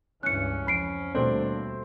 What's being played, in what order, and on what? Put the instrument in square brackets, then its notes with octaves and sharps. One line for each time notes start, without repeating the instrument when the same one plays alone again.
[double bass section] C#2 G2 E3 [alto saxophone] C#4 [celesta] F#6 C#7
[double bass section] F2 [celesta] B5 C7 D7
[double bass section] D#2 G3 [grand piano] B2 A3 C4 [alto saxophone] D4